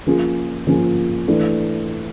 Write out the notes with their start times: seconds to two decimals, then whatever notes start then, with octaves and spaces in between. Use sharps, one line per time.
0.06 F3 A#3 C#4 F4 G#4
0.67 F3 A#3 C#4 F4 G#4
1.28 E3 A3 D4